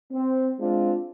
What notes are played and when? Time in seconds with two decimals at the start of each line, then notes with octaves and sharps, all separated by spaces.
0.12 C4
0.60 G#3 C4 D4 F4